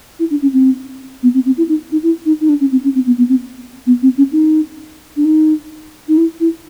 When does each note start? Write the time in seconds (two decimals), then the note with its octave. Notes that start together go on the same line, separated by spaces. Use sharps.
0.19 E4
0.30 D4
0.42 C#4
0.53 C4
1.23 B3
1.34 C4
1.46 C4
1.57 E4
1.69 D#4
1.92 D#4
2.03 E4
2.25 D#4
2.41 D#4
2.49 D4
2.60 C#4
2.71 C4
2.84 C#4
2.95 C4
3.06 B3
3.18 B3
3.29 C4
3.86 B3
4.02 C4
4.18 C#4
4.32 D#4
5.17 D4
5.25 D#4
6.08 D#4
6.17 E4
6.40 E4